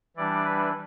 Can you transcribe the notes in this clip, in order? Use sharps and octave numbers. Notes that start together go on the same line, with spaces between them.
E3 G3 D4 D5
B4